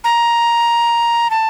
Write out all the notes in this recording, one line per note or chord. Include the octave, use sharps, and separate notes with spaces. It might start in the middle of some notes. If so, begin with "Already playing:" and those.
A#5
A5